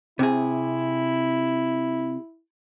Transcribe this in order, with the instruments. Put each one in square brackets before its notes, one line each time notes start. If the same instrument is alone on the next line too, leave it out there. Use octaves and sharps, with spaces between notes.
[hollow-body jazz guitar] C3 G#4 [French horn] E4